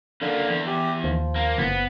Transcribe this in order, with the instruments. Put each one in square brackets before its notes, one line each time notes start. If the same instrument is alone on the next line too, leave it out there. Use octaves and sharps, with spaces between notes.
[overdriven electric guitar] F#2 A#3 [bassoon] D3
[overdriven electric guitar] E2
[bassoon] G4
[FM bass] D#2 [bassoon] F3
[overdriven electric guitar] A#3
[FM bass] F#1 [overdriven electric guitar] B3